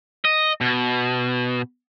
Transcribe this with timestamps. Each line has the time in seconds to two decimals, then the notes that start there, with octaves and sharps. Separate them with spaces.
0.25 D#5
0.61 B2